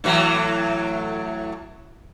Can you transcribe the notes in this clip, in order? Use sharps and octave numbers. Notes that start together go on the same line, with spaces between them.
A2 E3 F#3